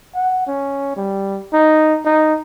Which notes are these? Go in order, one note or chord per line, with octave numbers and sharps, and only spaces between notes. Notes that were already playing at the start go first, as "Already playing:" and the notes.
F#5
C#4
G3
D#4
D#4